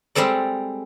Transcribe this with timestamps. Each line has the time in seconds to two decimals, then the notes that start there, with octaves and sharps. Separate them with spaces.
0.15 G3 G#3 C4 A4 D5